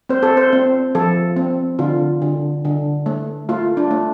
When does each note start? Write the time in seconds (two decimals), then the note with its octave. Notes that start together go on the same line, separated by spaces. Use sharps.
0.09 C4 C5
0.23 A4
0.37 C5
0.53 C4
0.95 F3 A4
1.36 C4
1.79 D3 F4
2.22 D3
2.65 D3
3.06 A3
3.49 A3 F4
3.77 D4
3.91 A3